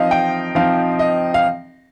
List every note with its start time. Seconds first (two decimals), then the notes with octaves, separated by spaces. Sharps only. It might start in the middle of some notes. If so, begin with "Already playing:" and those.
Already playing: F3 C4 D#4 D#5 F5
0.11 G5
0.55 F3 C4 D#4 F5
0.99 D#5
1.34 F5